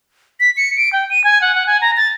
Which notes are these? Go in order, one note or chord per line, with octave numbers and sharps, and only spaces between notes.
B6
C#7
D7
G5
D#7
G#5
F#5
F#5
G#5
A#5
A6